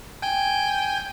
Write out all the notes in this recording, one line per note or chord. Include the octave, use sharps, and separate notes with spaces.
G5 G#5 G6